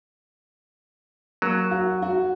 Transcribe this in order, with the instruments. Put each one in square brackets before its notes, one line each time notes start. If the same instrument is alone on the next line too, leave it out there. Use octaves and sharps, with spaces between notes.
[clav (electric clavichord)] F#3 [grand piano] A#3
[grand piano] F#4
F#4